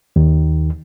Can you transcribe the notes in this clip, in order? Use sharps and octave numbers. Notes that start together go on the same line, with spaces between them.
D#2 D#3